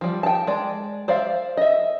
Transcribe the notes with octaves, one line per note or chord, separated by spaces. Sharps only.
F3 G3
G5 A5
G#3 D5
C5 D5 E5 F5
D#5 E5